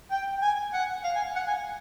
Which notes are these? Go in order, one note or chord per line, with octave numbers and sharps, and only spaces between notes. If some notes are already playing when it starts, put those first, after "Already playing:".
G5
G#5
F#5
F5
G#5
F#5
G#5